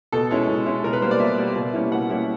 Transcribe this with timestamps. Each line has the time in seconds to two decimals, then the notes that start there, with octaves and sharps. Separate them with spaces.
0.12 B2 A4
0.31 G#3 C#4 E4
0.49 B2
0.66 G#3 C#4 E4
0.84 B2 A#4
0.93 B4
1.02 G3 A#3 C5
1.11 D5
1.20 B2 E5
1.39 G3 A#3
1.56 B2
1.74 G3 A#3 C#4 E4
1.91 B2 F#5
2.10 G3 A#3 C#4 E4